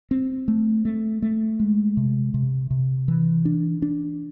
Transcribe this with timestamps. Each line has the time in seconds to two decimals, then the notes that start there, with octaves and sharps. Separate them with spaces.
0.11 C4
0.48 A3
0.85 A3
1.22 A3
1.60 G#3
1.97 C3
2.34 C3
2.71 C3
3.08 E3
3.45 D4
3.82 D4